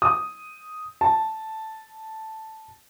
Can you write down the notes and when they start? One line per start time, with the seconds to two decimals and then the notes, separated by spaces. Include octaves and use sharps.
0.02 D#6
1.01 A5